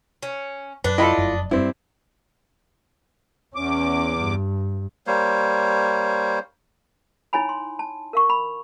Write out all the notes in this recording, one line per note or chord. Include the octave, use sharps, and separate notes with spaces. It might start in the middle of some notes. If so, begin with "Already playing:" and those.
C#4
F#2 D4 B4
E4 F4 A4 D#5 B5
F1 F#2
G2 C4 E4
E2 C#4 D6
G2
G3 A#3 C5 C#5
D#4 E4 C#5 G#5 B5
C6
A5
A#4 F5 C#6
B5